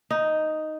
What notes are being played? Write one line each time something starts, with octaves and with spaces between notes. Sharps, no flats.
D#4